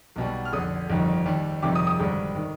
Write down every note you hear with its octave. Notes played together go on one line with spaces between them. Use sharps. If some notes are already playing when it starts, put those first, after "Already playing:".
B1 B2 G3
F6
F1 F2 D3 D#6
G1 F2 D#3 G3
D#2 D#3 G3
G1 F2 C3 D#3 G3 D6
D#6
D#6
G#1 G2 D3 G3
D#3